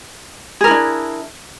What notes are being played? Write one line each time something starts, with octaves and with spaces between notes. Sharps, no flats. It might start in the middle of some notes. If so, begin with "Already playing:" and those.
D4 E4 G#4 A#4